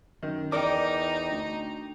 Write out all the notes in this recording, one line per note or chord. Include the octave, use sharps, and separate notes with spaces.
F#2 D#3
E2 D#4 A#4 D5 G5 D6
D2